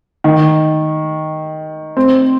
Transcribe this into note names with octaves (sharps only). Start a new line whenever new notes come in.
D#3
C4